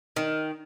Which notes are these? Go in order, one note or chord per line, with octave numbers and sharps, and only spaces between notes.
D#3